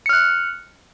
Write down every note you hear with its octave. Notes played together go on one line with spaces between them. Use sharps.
F6 F#6 C#7